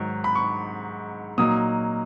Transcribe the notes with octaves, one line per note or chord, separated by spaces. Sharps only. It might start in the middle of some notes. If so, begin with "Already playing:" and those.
Already playing: G#2 D#3 F#3
B5
C#6
A#2 F#3 A#3 D#4 D#6